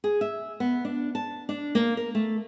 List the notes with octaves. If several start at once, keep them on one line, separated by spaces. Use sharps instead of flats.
G#4
E5
B3
D4
A5
D4
A#3
A#4
A3